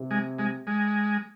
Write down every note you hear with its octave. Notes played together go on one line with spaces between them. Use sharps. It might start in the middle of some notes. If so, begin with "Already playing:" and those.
Already playing: C3
G#3
G#3
G#3